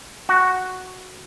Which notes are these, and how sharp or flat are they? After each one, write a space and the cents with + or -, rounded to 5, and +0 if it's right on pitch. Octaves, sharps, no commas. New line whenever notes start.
F#4 +0